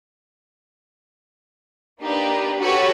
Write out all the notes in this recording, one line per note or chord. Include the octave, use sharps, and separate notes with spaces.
A#3 D4 D#4 G4 B4
F#4 G4 A4 B4 C#5